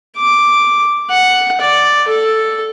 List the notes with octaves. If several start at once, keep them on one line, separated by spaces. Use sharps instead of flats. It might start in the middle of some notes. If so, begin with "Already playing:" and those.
D6
F#5
D5
A4